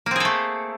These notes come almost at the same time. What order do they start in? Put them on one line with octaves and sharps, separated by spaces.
A#3 C4 G#4 A4 A3